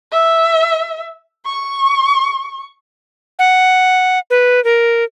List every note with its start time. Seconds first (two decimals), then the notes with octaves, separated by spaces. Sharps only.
0.12 E5
1.46 C#6
3.39 F#5
4.30 B4
4.64 A#4